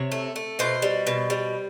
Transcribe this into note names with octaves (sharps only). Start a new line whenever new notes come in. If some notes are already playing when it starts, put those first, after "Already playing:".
Already playing: C3 C#5
A3
A3
B2 C5
G3
B2
G3